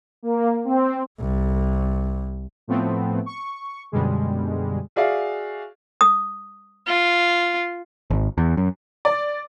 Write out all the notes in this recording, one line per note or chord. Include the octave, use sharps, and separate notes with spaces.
A#3
C4
C2
A2 F3 A3 B3 C4
C#6
F#2 B2 D3 G3 G#3
F#4 G#4 D5 E5 F5
D#6
F4
G#1
E2
F#2
D5